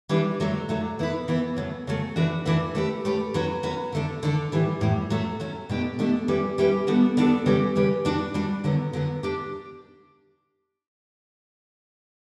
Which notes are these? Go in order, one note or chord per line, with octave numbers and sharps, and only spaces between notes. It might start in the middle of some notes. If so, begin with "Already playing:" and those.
E3 G3 D4 G4 B4
D3 F#3 A3
D3 F#3 A3
E3 B3 E4 B4
E3 B3 E4 B4
C#3 F#3 A3
C#3 F#3 A3
E3 A3 D4 F#4 B4
E3 A3 D4 F#4 B4
A3 C#4 G4 B4
A3 C#4 G4 B4
F#3 C#4 F#4 B4
F#3 C#4 F#4 B4
D3 A3 D4 A4
D3 A3 D4 A4
A2 E3 G3
A2 E3 G3
F#3 A3 C#4
F#3 A3 C#4
B2 A3 D4 G4
B2 A3 D4 G4
G3 C#4 E4 G4 B4
G3 C#4 E4 G4 B4
G3 B3 D4 F#4 A4
G3 B3 D4 F#4 A4
C#3 G3 C#4 G4 B4
C#3 G3 C#4 G4 B4
G3 D4 F#4
G3 D4 F#4
D3 F#3 B3
D3 F#3 B3
D4 G4